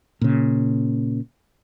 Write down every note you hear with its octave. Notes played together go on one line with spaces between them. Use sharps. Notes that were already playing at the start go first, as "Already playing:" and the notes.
A#2 C#3